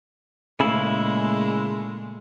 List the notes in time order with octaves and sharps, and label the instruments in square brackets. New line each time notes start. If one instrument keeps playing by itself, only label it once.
[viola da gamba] A#2 G#3 A3 [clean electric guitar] C#3 E4